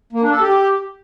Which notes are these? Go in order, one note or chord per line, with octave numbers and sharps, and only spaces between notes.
A#3
D4
A4
G4